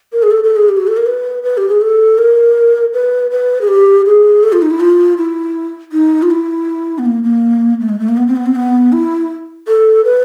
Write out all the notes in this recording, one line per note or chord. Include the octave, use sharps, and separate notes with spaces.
A#4
G#4
A4
A4
G#4
G4
F#4
A4
A#4
B4
B4
G4
G#4
A4
A#4
B4
B4
G#4
G4
G#4
A4
F4
D#4
E4
F4
E4
D#4
F4
E4
B3
A#3
A#3
A3
G#3
A3
A#3
B3
C4
B3
C4
B3
E4
A4
B4